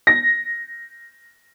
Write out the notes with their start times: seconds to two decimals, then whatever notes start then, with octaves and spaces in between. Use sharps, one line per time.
0.07 A#6